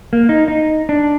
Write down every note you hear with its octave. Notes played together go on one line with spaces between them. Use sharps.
A#3
D#4
D#4
D4